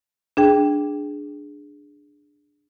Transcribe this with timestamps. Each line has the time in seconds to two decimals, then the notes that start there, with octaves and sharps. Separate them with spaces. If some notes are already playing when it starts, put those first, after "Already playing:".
0.37 D4 G#4 G5